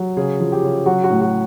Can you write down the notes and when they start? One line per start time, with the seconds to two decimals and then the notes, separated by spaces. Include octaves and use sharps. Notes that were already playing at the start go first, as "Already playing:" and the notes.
Already playing: F#3
0.17 C#3 G#4
0.40 F3
0.52 G4
0.63 C#3
0.86 F#3 F#4
1.04 F#4
1.09 A2
1.21 F#4